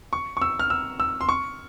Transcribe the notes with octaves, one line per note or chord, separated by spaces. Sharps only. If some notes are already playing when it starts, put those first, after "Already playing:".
C#6
C#6
E6
F6
E6
E6
C6
C#6